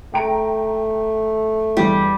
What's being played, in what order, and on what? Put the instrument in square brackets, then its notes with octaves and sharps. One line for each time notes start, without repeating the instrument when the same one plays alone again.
[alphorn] A3 [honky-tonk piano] G5 A#5 D7
[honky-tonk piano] E2 G2 [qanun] G3